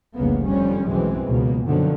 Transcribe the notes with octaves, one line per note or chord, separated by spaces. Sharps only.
F1 C2 C#3 A#3 B3
F2 D3 G3 C#4
B1 F#2 E3 G#3 C4
C#2 B2 A#3
F#2 B2 D3 D#3 F3 F#3